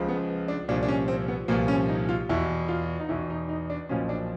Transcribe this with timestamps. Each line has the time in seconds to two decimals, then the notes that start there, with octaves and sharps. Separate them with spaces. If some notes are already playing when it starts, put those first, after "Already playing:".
Already playing: C#2 C#3 F3
0.08 B3
0.48 D4
0.68 C2 A#2 F3 D4
0.83 D4
0.88 C#4
1.08 C4
1.28 B3
1.48 C2 A#2 F3 A#3
1.68 C#4
1.88 D#4
2.09 F4
2.29 E2 B2 E4
2.68 F4
3.00 D#4
3.09 E2 B2 E4
3.30 D#4
3.49 D#4
3.70 D4
3.89 B1 A#2 F3 C#4
4.09 D4